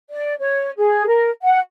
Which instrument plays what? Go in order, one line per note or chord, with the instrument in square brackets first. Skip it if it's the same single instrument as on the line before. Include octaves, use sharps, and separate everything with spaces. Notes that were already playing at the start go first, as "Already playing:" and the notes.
[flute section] D5
C#5
G#4
A#4
F#5